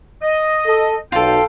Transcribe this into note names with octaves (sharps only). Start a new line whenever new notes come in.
D#5
A4
B1 F4 A4 G5